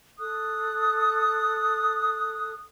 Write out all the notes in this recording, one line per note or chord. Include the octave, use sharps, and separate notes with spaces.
A4 D#6 F#6